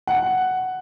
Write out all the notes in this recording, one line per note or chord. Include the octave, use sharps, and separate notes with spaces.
F#5